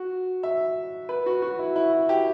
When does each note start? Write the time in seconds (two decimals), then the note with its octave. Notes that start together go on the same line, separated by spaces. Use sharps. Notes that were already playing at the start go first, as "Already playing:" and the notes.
Already playing: F#4
0.43 E5
1.09 B4
1.26 F#4
1.42 F#4
1.59 E4
1.76 E4
1.93 F#4
2.09 G4